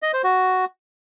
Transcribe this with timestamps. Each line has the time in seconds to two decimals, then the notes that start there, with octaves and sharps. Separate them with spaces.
0.02 D#5
0.13 C5
0.24 F#4